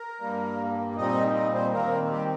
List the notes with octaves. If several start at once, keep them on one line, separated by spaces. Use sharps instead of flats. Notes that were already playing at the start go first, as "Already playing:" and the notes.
Already playing: A#4
G2 G3 A#3
A#2 G3 C4 D#4 D#5
D#4 D#5
C4 C5
D#2 D#3 A#3 C4 A#4
G3 G4